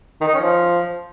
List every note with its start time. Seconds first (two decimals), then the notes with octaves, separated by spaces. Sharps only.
0.21 D#3
0.28 D#4
0.34 C#4
0.41 F3